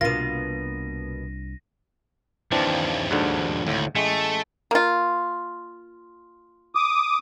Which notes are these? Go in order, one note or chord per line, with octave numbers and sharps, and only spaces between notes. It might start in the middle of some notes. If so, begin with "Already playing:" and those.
C2 B2 E3 A#3 D4 F4 A#6 D#7
D#2 E3 F3 C4 D4
D2 G#2 D3
G#1 D2 A2
A1 G#3 A3
A#3 F4
D6 D#6